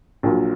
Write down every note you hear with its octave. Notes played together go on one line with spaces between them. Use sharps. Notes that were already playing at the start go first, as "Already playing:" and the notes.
A#1 A#2 F#3